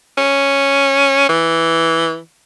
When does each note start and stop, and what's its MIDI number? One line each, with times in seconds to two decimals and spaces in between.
0.18 1.26 61
1.29 2.18 52